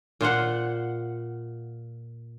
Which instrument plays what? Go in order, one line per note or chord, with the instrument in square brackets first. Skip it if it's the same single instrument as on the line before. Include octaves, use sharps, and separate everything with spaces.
[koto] A#2 F4 C5 F#5